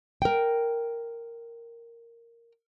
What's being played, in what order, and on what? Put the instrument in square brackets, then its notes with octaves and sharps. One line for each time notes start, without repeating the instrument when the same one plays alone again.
[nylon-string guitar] A#4 G5